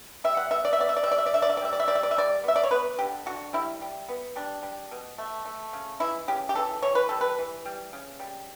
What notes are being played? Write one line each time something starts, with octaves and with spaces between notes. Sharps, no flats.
G3 E5
F#5
B3 E5
D5
E5
B3 D5
E5
D5
E5
G3
D5
E5
D5
D3 E5
D5
E5
D5
G3 E5
D5
E5
G3 D5
E5
D5
E5
G3 D5
B3 E5
D5
C#5
B3 B4
D3 G4
D3 F#4
G3 E4
G3
B3
G3 D4
G3
B2
A3
A3
C#3
E3 E4
C#3 G4
G4
E3 A4
E3 C#5
B4
G3 A4
B4
E3
G3
C#3
G3